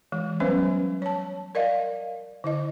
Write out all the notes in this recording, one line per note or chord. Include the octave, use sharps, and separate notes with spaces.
E3 G#3
F#3 G3 B3 C#4 B4 C5
C#5 A5
A#4 D5 D#5 F5
D3 E4 D#5